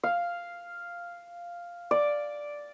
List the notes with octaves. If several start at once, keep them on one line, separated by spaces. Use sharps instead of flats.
F5
D5